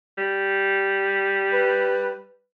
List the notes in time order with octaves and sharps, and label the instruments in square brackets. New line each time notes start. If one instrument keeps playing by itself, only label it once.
[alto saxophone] G3
[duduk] B4